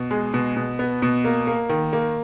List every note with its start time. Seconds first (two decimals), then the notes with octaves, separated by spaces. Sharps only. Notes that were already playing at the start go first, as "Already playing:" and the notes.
Already playing: B2
0.11 G#3
0.34 B2
0.57 B2
0.79 B3
1.02 B2
1.24 A#3
1.47 A#3
1.69 D#3
1.93 A#3